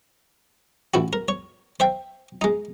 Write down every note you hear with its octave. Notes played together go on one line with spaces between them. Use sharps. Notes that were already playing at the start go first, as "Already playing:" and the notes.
A1 E4 F#4
A#4
C#5
C5 E5 G5
G#3 D#4